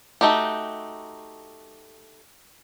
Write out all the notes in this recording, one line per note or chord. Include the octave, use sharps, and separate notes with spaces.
A3 D#4 F#4 G4